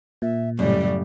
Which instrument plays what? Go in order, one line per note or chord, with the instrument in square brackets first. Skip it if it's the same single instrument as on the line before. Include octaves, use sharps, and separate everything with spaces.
[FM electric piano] A#2 [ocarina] E5
[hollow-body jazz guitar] F#2 [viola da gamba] A2 C#3 G3 [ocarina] D5